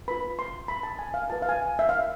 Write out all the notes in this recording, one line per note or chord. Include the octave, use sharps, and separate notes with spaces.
F4 B4 B5
C6
B5
A5
G#5
F5
F4 B4 A5
F5
G#5
E5
F5